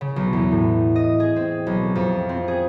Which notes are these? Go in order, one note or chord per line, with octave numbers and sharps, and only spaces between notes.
C#3
B1
E2
A2
D#5
G#4
C4
B1
F2
C4
G#4